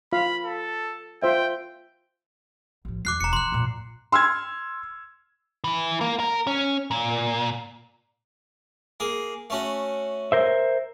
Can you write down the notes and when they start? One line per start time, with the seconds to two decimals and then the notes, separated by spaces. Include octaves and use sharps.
0.13 F4 F5 B5
0.45 A4
1.22 F4 C5 E5 G5
2.85 A1 F3
3.05 E2 E3 D6 F#6 C7
3.21 E1 A#5 C#7
3.33 E3 C6 F#6
3.52 F2 A#2
4.12 C6 E6 F6 G#6
5.64 E3
6.01 A#3
6.20 A#4
6.47 C#4
6.91 A#2
9.00 A#3 G#4
9.50 A3 C#4 F#4
10.32 A#4 C5 E5